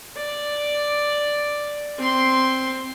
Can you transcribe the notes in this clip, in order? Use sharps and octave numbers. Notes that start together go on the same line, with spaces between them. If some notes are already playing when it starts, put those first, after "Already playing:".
D5
C4 C6